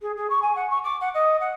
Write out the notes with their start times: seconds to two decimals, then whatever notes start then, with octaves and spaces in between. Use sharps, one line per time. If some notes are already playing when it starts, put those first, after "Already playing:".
0.02 G#4
0.17 G#4
0.30 C#6
0.42 G#5
0.55 F#5
0.70 C#6
0.84 D6
1.01 F#5
1.14 D#5
1.40 F#5